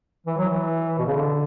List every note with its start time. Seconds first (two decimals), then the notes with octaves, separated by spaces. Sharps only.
0.26 E3
0.37 F#3
0.49 E3
0.99 B2
1.06 C#3
1.14 D3